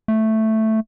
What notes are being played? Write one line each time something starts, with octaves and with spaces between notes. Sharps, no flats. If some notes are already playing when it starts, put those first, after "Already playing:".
A3